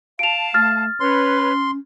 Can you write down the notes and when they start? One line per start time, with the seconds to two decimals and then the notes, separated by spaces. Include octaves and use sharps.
0.19 F5 A5 D7 F7
0.54 A3 F6 A6
1.00 C#4 B4 C#5 C6